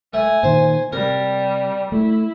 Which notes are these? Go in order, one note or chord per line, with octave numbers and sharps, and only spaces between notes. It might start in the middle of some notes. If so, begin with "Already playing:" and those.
A3 G#5
A#2 D#3 C5
C3 G3 A#4
A3 E4